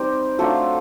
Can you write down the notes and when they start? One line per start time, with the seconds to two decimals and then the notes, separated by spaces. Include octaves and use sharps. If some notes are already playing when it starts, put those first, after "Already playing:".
Already playing: G3 C4 D#4 G4
0.39 F#3 A3 D4 F4 A4